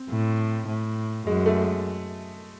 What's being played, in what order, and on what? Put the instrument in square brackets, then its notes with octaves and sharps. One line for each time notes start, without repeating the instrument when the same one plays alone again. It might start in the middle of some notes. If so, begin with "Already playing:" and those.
Already playing: [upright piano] C4
[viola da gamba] A2
A2
[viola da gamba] F#2 [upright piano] G#3
[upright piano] A3
G#3